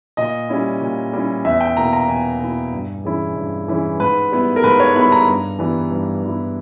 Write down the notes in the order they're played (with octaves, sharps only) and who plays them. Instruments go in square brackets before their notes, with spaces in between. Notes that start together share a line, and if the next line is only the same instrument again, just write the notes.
[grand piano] A#2 D#5
G3 C#4 E4
A#2
G3 C#4 E4
E2 E5
G5
B2 A#3 E4 A#5
A#5
E2 G#5
B2 A#3 E4
G2
E3 G#3 C#4 E4
G2
E3 G#3 C#4 E4
G#2 B4
G3 B3 E4
A#4
G#2 B4
C#5
G3 B3 E4 B5
A#5
G2
E3 G3 B3 E4
G2
E3 G3 B3 E4